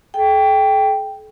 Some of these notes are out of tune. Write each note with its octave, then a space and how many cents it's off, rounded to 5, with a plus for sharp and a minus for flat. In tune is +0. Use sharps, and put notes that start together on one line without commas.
A4 -40 G5 +0